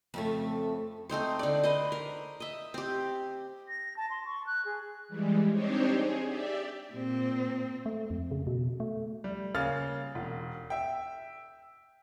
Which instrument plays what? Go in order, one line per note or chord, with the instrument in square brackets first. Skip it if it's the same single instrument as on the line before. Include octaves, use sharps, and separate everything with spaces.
[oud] F2 C#3 A3
[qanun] A3 C4 D#4 C5
D3 D5
B4 C5 D#5
A#4
D#5 E5
C4 G4
[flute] A#6
A5
C6
C#6
F#6
G#4
[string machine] E3 G3 G#3
C4 D4 D#4 G4 C5 C#5
G#4
G4 D5 E5
[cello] A#2 C4
[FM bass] A3
F2
C#3
B2
A3
[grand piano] G3
C#3 A#3 F5 F6 A6
E1
E5 G5